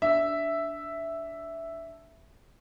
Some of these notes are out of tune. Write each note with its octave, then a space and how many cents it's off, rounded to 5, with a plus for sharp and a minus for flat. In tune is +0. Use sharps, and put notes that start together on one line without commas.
D4 -10 E5 +0